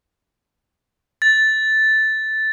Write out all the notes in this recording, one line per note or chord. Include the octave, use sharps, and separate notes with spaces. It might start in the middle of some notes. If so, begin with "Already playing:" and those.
A6